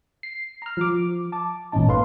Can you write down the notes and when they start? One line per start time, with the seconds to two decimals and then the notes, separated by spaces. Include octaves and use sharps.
0.23 C7
0.62 A#5 F6
0.77 F3 D6
1.32 A5 D6
1.72 G#1 A#2 E3 C#4 D#4 A5
1.88 A#3 A4 B4 F5 C6